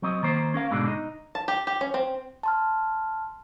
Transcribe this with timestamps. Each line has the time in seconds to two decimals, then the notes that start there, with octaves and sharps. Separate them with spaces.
0.02 F#3 C4 D#5
0.23 D#3 A#3 C5
0.54 C#4 A#4 F5
0.71 G#2 B2 D3 G#3 D4
0.88 D#4
1.35 A5
1.48 G4
1.67 G4
1.81 C#4
1.94 C4
2.43 A5 C6 F6